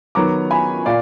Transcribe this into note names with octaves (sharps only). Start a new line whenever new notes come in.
D#3 F#3 B3 A#5 D6
G#5 B5
A#2 D5 F5